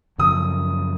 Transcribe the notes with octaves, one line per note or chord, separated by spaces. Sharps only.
F#2 C#3 F3 D#6